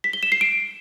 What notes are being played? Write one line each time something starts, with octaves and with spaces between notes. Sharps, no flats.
B6
G7
E7
C7
D7